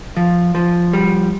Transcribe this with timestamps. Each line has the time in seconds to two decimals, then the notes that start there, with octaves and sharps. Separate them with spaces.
0.17 F3
0.55 F3
0.93 G3